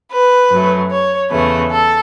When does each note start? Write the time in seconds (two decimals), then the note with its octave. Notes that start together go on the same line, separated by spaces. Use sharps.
0.12 B4
0.51 F#2 F#3 A3
0.91 C#5
1.31 E2 C#3 A3 B4
1.71 A4